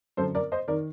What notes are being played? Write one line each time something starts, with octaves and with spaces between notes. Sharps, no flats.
F#2 D3 A4 C5
A#4 D5
C5 D#5
D#3 A#4 D5